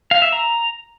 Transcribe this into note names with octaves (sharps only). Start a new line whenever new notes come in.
F5
E5
A#5